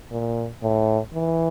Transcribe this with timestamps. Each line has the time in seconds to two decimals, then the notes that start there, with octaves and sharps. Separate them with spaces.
0.11 A#2
0.62 A2
1.14 E3